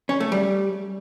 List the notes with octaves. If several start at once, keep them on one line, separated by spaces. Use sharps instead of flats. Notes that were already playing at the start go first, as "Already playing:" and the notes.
C#4
A3
G3